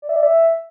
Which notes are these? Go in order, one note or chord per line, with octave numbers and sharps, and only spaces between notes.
D5
E5
D5
E5